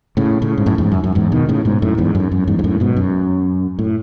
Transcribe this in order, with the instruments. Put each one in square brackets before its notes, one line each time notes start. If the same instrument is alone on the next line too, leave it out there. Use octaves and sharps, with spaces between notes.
[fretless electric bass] A2 C#3
A2 C#3
G#2
F#2 A2
E2 G#2
F#2
F#2
E2 G#2
B2 D#3
A2 C#3
G#2 B2
F#2 A2
E2 G#2
F#2
F#2
E2 G#2
G#2
F#2 A2
G#2 B2
F#2
A2